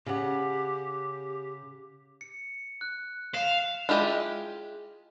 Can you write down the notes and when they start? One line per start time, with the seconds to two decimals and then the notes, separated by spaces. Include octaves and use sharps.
0.06 C#3 G4 F#5
2.21 C#7
2.81 F#6
3.34 F5 E7
3.89 G#3 E4 F4 G4 D#5